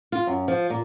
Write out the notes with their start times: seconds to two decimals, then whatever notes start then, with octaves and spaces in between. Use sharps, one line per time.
0.12 F4
0.27 F#2
0.48 F3
0.70 A#2